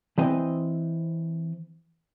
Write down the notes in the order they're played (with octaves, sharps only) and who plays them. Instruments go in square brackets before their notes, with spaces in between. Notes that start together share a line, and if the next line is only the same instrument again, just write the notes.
[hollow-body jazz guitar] E3 C4 D#5